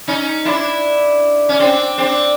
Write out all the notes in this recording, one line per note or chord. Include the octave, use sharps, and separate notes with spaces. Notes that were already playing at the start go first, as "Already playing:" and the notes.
C#4 D#4
D4 E4
C#4
C4 D4
C4 D4